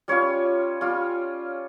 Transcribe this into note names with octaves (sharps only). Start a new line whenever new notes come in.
G3 C#4 F4 C#5
G3 C#4 F4